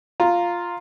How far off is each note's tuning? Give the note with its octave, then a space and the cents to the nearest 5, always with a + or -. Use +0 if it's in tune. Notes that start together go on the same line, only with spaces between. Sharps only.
F4 +0 A#5 -5